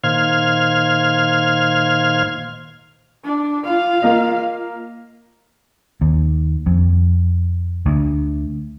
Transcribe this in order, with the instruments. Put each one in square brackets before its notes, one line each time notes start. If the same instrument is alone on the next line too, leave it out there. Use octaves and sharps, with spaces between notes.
[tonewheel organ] A#2 D#3 C5 F5 F6 G#6
[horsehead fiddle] D4
F4 F5
[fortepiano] A#3 D#5
[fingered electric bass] D#2
F2
D2